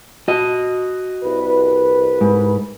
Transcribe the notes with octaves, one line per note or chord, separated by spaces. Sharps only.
F#4 D#5
C2 B4
G#2